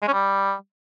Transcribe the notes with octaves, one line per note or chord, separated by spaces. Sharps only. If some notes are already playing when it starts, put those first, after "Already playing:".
G#3
C#4
G3